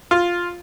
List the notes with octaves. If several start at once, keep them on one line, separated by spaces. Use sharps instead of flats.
F4